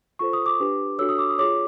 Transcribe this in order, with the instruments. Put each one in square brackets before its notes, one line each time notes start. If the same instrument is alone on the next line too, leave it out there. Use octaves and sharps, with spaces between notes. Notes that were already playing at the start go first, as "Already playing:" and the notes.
[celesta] F4 A4 C5 C#6
D#6
D6
D4 G4 B4
D4 F#4 A4 C#5 E6
D#6
D6
D#6
F4 G#4 C#5 D6